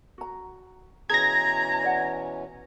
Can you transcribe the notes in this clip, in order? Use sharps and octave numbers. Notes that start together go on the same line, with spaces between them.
F#4 A#5
B2 E3 C#4 G#4 A#5 G#6 A#6
D5 F#5